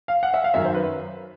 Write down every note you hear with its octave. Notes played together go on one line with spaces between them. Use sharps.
F5
F#5
E5
F5
F#2 D#3 F#3 E5
C5
B4